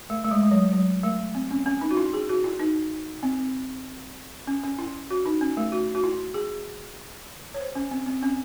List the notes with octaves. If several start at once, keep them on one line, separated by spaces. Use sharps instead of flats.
A3
A3
G#3
G#3
F#3
F#3
A3
C4
C#4
C#4
D#4
F#4
E4
G#4
F#4
E4
D#4
C4
C#4
C#4
E4
F#4
D#4
C#4
A3
F#4
F#4
E4
G#4
C#5
C5
C#4
C4
C4
C#4